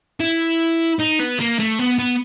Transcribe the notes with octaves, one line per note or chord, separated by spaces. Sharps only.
E4
D#4
B3
A#3
A3
B3
B3